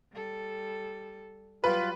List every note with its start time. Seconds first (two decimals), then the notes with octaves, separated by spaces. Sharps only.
0.13 G3 A4
1.64 F#3 G3 F4 B4